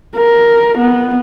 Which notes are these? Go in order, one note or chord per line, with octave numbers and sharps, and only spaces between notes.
A#4
B3